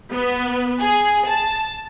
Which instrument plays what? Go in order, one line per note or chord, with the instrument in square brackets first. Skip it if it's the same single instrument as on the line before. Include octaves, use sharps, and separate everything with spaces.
[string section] B3
G#4
A5